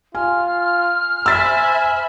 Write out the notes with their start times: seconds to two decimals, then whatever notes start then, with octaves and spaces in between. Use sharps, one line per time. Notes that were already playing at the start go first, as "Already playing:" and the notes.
0.15 F4 G#5 F6
1.26 C5 E5 G#5 B5 E6 A6 B6